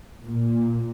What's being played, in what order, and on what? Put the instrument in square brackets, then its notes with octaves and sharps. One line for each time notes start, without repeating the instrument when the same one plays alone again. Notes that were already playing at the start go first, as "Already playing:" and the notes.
[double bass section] A#2